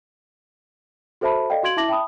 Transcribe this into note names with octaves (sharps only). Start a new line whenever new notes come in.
F#4 A4 C5 E5 A5 B5
A4 D5 D#5 F5 G5
F#4 F5 C6 G#6 D7 F#7
E4 E5 A5 D6 A#6 F#7
E5 G5 A5 B5 D#6